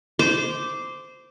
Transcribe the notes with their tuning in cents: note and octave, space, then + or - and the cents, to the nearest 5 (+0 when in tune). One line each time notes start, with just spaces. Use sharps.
C5 -15 D6 -5